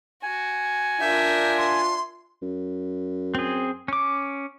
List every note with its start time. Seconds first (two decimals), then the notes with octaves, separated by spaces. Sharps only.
0.23 F#4 G#5
1.01 D4 F4 A#4 E5 G6
1.57 C6
2.42 F#2
3.35 C4 G#4
3.88 C#4 D6